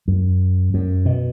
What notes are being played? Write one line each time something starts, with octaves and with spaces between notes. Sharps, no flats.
F#2
F#2
B2